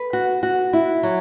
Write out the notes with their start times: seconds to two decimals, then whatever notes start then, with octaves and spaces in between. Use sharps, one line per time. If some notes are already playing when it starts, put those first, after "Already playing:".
Already playing: B4
0.13 F#4
0.43 F#4
0.73 E4
1.03 F#3